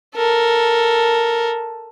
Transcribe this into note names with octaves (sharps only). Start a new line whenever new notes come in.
A4 A#4